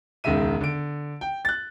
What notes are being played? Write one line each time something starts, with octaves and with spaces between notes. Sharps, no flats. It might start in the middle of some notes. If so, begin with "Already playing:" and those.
E1 C#2 D#3 G#3 E5 D#7
D3 D7
G5
F#6 A6